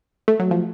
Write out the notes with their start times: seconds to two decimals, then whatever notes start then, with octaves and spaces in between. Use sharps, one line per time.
0.28 A3
0.39 F#3
0.51 F3